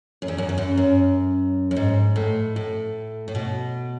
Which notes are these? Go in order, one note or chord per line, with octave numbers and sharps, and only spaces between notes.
F#2
E2
F#2
E2
F#2
F#2
F#2
G#2
A2
A2
A2
B2